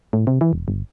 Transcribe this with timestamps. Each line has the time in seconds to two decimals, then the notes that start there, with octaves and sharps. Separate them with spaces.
0.13 A2
0.27 C3
0.41 E3
0.53 E1
0.68 G1